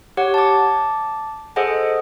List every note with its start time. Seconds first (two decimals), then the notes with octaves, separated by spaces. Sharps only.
0.17 G4 C#5 F#5
0.34 A5 D6
1.56 G#4 A4 C5 D#5 F#5 G#5